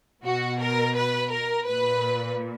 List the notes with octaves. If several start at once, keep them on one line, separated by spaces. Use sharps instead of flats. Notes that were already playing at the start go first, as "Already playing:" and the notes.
B2 F#4
A#4
B4
A#4
A#2 B4